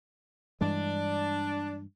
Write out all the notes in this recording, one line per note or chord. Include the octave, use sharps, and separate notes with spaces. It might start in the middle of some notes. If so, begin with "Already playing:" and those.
G2 E3 G#3 D4